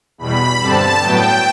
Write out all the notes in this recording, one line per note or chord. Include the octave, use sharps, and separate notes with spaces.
E2 B2 G3 B5
G2 D3 G3 C4 A5
A2 F#3 B3 G5